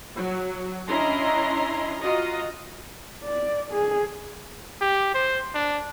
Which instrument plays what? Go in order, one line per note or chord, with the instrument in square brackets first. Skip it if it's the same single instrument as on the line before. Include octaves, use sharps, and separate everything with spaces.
[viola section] F#3 F#4
C#4 D4 E4 D#5 A#5 C6
F4 F#4 D#5 A#5
[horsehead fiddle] D5
G#4
[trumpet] G4
C5
D4